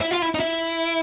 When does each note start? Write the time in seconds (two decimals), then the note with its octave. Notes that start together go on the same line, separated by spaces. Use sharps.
0.01 E4
0.11 F4
0.22 E4
0.35 D#4
0.40 E4